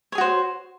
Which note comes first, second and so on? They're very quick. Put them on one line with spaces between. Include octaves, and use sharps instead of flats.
C#5 G#4 F#4 C5